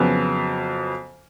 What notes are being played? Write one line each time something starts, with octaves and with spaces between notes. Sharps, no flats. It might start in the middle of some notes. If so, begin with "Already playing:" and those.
Already playing: F2 C#3 F#3 B3